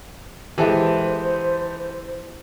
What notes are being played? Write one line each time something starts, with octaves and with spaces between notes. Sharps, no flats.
E3 G#3 G4 A4 C5 E5